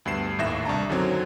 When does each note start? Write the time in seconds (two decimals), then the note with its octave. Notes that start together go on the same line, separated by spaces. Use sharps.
0.05 D2 G2 B3 C7 E7
0.38 G#1 D#2 A2 E5 A#6 E7
0.65 C2 D4 A5 A#5
0.89 F#2 D3 D#3 F#3 C4